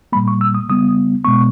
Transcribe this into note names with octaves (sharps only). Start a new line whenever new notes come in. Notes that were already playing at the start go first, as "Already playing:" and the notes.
A#2 G3 A#3 B5
C#6
E6
D#6
C#3 G3 B3 D#6
B2 G#3 B3 C#6